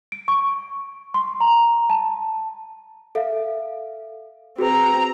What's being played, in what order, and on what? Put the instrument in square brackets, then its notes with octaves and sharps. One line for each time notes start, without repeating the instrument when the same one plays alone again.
[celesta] D7
C#6
C6
A#5
A5
A4 E5 F5
[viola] C4 A#5 [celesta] F#4 G#4 B4